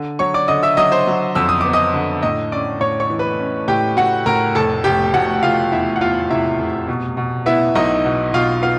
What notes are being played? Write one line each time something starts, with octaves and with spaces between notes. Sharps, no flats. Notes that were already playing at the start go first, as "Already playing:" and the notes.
Already playing: D3
F#3 C#5 C#6
D5 D6
D3 D#5 D#6
E5 E6
F#3 D#5 D#6
C5 C6
F#3
F2 E6
D#6
B3 D6
D#5 D#6
D3
A2 D#5 D#6
C#4 D5 D6
A2 C#5 C#6
C#5 C#6
E3
B4 B5
C#4
A2 G4 G5
A2 F#4 F#5
A2 A#4 A#5
F1 A4 A5
F1 G4 G5
F1 F#4 F#5
F1 F4 F5
E2 E4 E5
F#5
E2 F4 F5
C3 E4 E5
F1
B2
B2
B3 E4 E5
B1 D#4 D#5
B2
B2 F4 F5
B3 F4 F5